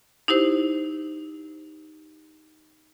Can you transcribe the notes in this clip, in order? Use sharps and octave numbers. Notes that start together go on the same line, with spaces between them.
D#4 E4 G4 C5